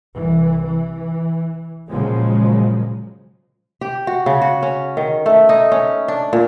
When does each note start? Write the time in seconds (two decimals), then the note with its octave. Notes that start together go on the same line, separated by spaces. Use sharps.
0.17 C2 E3
0.66 E3
1.91 A#2 C#3 F3 F#3 G#3 A#3
3.81 G4
4.07 F#4
4.26 C#3
4.41 F#4
4.63 C#4
4.97 D#3
5.26 A3
5.49 D#4
5.72 C#4
6.08 D4
6.33 A#2